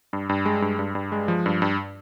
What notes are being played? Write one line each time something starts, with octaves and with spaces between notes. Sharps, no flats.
G2
G2
G#3
G2
G2
G2
G#3
F3
G2
G2